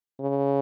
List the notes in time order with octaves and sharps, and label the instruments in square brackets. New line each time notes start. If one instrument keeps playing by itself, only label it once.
[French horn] C#3